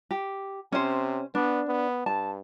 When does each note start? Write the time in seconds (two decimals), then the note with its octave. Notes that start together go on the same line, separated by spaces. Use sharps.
0.11 G4
0.72 C3 C#4 C5
1.35 B3 D4
1.68 B3
2.06 G2 A5